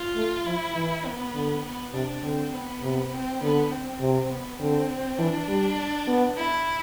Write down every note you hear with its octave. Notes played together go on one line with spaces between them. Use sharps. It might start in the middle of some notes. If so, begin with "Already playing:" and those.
Already playing: F4
A3
F3 E4
E3
B3
D3
B3
C3 D4
D3 C4
B3
C3
C4
D3 B3
C4
C3
B3
D3 C4
E3 D4
G3
B3
E4